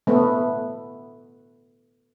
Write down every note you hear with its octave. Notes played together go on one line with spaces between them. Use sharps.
A3 B3